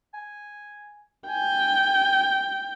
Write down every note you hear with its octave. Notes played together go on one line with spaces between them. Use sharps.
G#5
G5 G#5